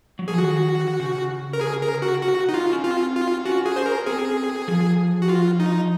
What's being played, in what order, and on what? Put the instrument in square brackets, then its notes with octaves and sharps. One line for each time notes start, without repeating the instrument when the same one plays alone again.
[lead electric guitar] F#3
[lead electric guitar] F3 [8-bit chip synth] G#4
[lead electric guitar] D#3 [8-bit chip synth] F#4
[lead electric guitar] C#3
[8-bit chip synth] A#4
G#4
A#4
F#4
F#4
D#4
F4
[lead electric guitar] C#4
[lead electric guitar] C4 [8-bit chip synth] F4
[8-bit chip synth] F4
[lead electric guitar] C#4 [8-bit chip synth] F#4
[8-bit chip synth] G#4
C5
A#4
[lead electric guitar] C4 [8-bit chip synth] G#4
[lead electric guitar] F3
[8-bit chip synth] F#4
F4
D#4